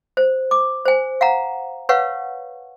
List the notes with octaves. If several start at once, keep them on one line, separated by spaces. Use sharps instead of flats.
C5
D6
C5 G#5
F5 F#5 A#5
B4 C#5 F5 F#5 C#6